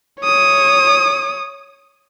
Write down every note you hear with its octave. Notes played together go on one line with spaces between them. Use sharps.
C#5 D#6